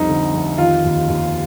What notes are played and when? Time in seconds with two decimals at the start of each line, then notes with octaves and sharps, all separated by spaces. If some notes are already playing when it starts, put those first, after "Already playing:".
Already playing: C2 F2 D#4
0.09 D3
0.33 F1
0.58 D#3 F4
0.84 D#2
1.08 D#2